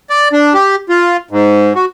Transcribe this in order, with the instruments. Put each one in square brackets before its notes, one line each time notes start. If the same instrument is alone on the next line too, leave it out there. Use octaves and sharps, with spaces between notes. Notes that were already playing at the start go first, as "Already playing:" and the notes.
[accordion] D5
D4
G4
F4
G#2
F#4